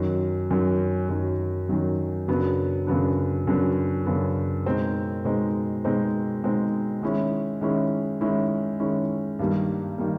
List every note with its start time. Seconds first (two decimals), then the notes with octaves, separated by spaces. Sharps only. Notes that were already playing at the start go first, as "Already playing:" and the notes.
Already playing: F#2 D#3 F#3
0.51 F#2 D#3 F#3
1.09 F#2 D#3 F#3
1.69 F#2 D#3 F#3
2.28 F#2 C#3 F#3 B3 D4
2.87 F#2 C#3 F#3 B3 D4
3.47 F#2 C#3 F#3 B3 D4
4.06 F#2 C#3 F#3 B3 D4
4.66 B2 G#3 C4 D#4
5.24 B2 G#3 C4 D#4
5.84 B2 G#3 C4 D#4
6.43 B2 G#3 C4 D#4
7.02 D#3 G#3 C#4 E4
7.61 D#3 G#3 C#4 E4
8.21 D#3 G#3 C#4 E4
8.80 D#3 G#3 C#4 E4
9.39 G2 D#3 G3 A#3
9.98 D#3 G3 A#3